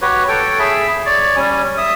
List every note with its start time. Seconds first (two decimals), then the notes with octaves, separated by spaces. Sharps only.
0.02 F#4 G4 B4 C#5
0.28 A4 C#5 G5
0.59 G#4 E5 B5
1.06 C#5 D5
1.36 G3 C#4 G#5
1.77 E5 D#6